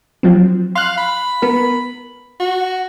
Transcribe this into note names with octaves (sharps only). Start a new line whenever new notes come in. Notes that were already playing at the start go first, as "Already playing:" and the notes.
F3 F#3 C4
F5 C6 F6 F#6
B5
B3 A#4
F#4